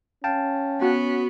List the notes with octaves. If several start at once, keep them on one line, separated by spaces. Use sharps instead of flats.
C#4 F5 G5 A5
B3 F#4